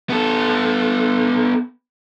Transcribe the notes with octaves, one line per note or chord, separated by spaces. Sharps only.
B3 A4